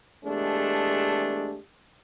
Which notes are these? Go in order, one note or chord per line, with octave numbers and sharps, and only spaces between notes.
E2 G#3 A3 D4 G4